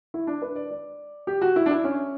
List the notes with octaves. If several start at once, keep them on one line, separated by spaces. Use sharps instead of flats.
E4
D4
B4
D5
D5
G4
F#4
E4
D4
E4
C#4